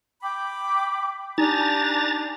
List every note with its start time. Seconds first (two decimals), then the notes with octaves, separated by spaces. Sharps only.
0.22 G5 B5 D6
1.38 D4 D#4 G4 G#5 A#5 A6